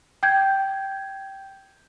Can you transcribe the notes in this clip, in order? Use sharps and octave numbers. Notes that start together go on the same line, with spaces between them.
G5 G6 G#6